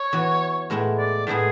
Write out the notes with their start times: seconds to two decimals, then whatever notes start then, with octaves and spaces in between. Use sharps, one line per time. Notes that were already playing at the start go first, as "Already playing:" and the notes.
Already playing: C#5
0.13 E3 B3 F#4
0.70 A2 G#3 B3 E4
0.98 D5
1.27 A2 G#3 B3 E4 G#4